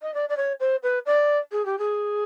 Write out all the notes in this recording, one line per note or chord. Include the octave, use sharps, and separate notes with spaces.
D#5
D5
D5
C#5
C5
B4
D5
G#4
G4
G#4